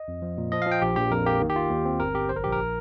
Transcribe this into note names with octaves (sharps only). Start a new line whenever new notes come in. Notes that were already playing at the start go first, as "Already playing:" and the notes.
Already playing: D#5
F2
F3
A#2
F3 D#5
F5
F3 G5
A#1 G4
A#1 G4
F2 A#4
A#3 G4
D#3
G4
F4
D#2
C4
G1 A#4
G1 G4
A#1 C5
A#4
A#1 G4
A#4